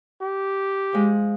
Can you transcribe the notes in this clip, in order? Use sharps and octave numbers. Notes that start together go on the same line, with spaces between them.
G4
F3 G#3